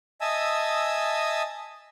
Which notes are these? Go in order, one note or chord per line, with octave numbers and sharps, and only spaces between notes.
D#5 E5 G#5 A5 D#6 E6